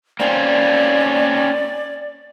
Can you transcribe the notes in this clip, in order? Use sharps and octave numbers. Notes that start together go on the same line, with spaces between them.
A#3 C4 C#4 D5